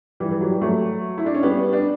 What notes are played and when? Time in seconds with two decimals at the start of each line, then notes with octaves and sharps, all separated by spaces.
0.20 E3 G3
0.31 E3
0.41 F#3
0.51 G3
0.61 F#3 A3
1.18 E4
1.26 D4
1.34 C#4
1.43 G3 B3
1.73 D4